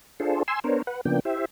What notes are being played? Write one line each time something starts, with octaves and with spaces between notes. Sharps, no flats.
D4 F4 G#4 A4 C5
G#5 C6 E6
B3 D4 A#4 C5 C#5
B4 F#5
C#3 F3 A#3 B3 D4 G5
E4 G4 C5 E5